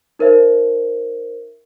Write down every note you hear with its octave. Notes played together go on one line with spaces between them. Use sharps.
D#4 A#4 C5 E5